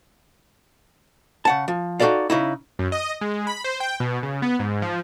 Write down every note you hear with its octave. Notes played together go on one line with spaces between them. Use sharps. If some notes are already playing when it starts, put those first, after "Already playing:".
C#3 F#5 A5
F3
D#4 F#4 G#4 A4 D5 F5
C#3 D#4 E4
F#2
D#5
G#3
B5
C5
G5
B2
C#3
B3
G#2
F3